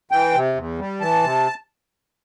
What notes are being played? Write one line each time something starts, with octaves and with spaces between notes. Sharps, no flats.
E3 G5
C3
E2
G3
E3 A5
C3